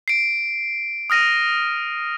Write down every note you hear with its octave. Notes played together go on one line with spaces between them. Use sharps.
C7 D7
D#6 F6 A#6 D#7